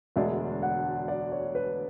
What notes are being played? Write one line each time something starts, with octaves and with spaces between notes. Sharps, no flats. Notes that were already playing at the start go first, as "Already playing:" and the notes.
E1 D2 D3 G#3 D4 E5
F#5
D5
C#5
B4